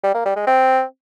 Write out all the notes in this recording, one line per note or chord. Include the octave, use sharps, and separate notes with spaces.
G3
A#3
G3
G#3
C4